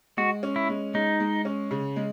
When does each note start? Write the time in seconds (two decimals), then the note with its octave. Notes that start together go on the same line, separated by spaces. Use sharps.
0.17 G#3 F#4
0.43 C#4
0.56 E4
0.69 G#3
0.94 G#3 D#4
1.20 G#3
1.45 C#4
1.71 C#3
1.96 G#3